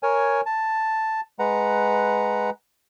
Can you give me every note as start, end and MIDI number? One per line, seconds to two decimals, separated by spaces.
0.03 0.41 70
0.03 0.41 73
0.03 0.41 80
0.46 1.21 81
1.39 2.50 56
1.39 2.50 71
1.39 2.50 78
1.39 2.50 82